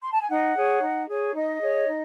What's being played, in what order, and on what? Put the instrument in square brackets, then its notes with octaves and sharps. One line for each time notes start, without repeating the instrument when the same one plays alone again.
[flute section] C6
A5
G#5
D#4 F#5
G#4 C#5
D#4
G#4 C#5
D#4 D#5
G#4 C#5
D#4